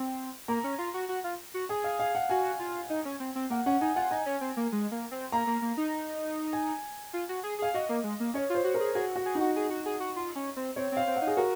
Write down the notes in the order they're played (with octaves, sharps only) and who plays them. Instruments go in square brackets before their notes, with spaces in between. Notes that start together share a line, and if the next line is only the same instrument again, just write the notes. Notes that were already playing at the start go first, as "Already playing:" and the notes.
Already playing: [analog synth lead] C4
[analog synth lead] A#3 [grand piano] A#5
[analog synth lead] C#4
F4
F#4
F#4
F4
F#4
[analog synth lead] G#4 [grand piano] G#5
[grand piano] F5
F5
F#5
[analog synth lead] F#4 [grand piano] G#5
[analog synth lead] F4
D#4
C#4
C4
C4
[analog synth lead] A#3 [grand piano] F#5
[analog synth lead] C#4 [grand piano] F#5
[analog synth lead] D#4 [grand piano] G#5
[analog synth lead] F4 [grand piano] F#5
[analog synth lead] D#4 [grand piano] G#5
[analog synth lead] C#4
C4
A#3
G#3
A#3
C4
[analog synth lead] A#3 [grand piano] A#5
[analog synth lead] A#3
A#3
D#4
[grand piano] G#5
[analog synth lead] F4
F#4
G#4
[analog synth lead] G#4 [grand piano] F5
[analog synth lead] F#4 [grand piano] D#5
[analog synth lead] A#3
G#3
A#3
[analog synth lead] C#4 [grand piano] C#5
[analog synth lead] F4 [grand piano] C5
[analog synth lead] F#4
[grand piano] A#4
[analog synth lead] G#4
[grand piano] F#4 [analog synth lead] G#4
[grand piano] F#4
[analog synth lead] G#4
[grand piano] D#4
[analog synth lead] F#4
G#4
F#4
G#4
F#4
F4
C#4
C4
[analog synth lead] C4 [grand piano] C#5
[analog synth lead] C4 [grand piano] F5
[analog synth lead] C4
[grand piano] F#5
[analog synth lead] D#4
[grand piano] G#4
[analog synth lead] F#4 [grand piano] A#4